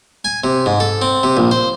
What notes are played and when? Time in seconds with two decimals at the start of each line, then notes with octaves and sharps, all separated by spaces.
0.25 G#5
0.44 C3
0.66 G#2
0.80 A4
1.02 C4
1.23 C3
1.37 A#1
1.51 C5